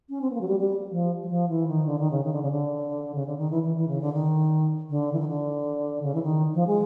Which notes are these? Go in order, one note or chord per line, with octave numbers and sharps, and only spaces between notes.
C#4
C4
B3
A#3
F#3
G3
G3
F3
F#3
F3
E3
D#3
D3
D#3
C#3
D#3
D3
C#3
D3
C#3
D3
D#3
E3
E3
E3
C#3
D3
D#3
D3
E3
D#3
D3
C#3
E3
D#3
F3
G#3